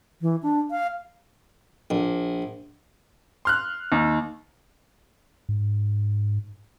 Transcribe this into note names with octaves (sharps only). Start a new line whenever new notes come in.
E3
D4
F5
A#1
C6 F6 F#6
D#2
G#2